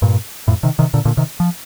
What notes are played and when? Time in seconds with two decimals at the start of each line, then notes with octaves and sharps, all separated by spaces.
0.02 G2 A#2
0.48 F2 A2
0.63 C3 D#3
0.79 C3 D#3
0.94 A#2 D3
1.05 A#2 D3
1.17 C3 D#3
1.40 F3